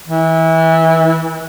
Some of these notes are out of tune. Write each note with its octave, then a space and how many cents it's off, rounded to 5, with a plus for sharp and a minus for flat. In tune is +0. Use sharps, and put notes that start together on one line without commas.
E3 -25